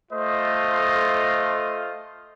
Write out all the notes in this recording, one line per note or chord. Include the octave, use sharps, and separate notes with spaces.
A3 F4 C5 D#5